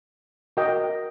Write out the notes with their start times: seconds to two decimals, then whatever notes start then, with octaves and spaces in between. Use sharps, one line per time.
0.57 F#4 A#4 D#5 G5